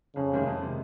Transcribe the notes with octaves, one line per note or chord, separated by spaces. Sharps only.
F2 C#3
C3 D#3 G#3
F2
C3 D#3 G#3